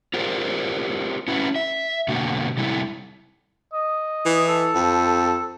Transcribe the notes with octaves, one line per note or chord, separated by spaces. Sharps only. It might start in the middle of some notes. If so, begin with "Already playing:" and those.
F4 G4 G#4 A#4 C5 D5
C#4 E4 F#4 B4
E5
B2 D3 A#3 F#4 G5
C3 G3 E4 A4
D#5
E3
A4
F2